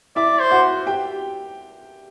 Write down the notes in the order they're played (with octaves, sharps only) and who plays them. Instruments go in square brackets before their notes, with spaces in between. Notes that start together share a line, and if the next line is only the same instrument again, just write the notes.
[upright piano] E4 E5 [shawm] D5
[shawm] C5
[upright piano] F#4 F#5
G4 G5